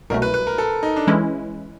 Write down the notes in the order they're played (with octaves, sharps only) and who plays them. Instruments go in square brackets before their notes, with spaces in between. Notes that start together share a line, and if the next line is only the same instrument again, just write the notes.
[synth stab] C2 B2 F#3 A3 [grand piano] A#4
[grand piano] B4
B4
A#4
A4
D#4
D4
[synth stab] E3 G#3 C#4 E4